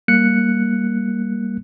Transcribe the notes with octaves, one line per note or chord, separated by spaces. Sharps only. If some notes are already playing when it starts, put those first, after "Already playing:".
G3 A#3 F#6 C#7